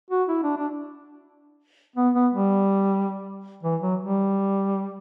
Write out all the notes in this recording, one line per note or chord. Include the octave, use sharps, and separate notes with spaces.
F#4
E4
D4
D4
B3
B3
G3
E3
F#3
G3